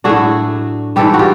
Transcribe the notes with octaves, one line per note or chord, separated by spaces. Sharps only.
A2 F#3 A3 D4 F#4 G#4
G#2 E3 G3 G4 A4
F#4
F4 G4